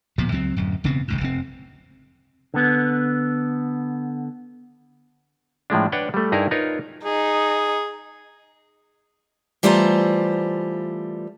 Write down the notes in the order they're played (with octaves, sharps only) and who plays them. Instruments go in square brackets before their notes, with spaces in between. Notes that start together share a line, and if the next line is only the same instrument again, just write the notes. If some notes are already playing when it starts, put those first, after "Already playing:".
[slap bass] D1 A#2 F3 B3
C#2 F#3 C4
D1 F#2
E1 C#3 B3 C4
D#1 C#2 G#2
F1 C4
[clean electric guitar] D3 B3
[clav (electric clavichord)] A2 F3 G#3 D4
D4 B4 C#5 F#5 G5
G3 A3
G2 D#4 E4 G#4 A#4 A#5
D#4 F4 A#4 B4 C#5
[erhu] D#4 [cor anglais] G#4
[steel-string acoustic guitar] E3 G3 A3 F4 C5 A#5